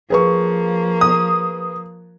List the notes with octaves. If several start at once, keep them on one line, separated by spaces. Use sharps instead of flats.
F3 A#3 G#4 B4 C#6
D#6